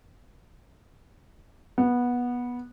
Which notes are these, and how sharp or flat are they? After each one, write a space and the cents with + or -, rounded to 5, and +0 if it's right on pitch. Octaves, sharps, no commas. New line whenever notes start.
B3 -15